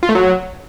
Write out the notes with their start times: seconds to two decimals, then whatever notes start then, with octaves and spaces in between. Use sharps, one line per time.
0.03 F4
0.09 A3
0.15 F#3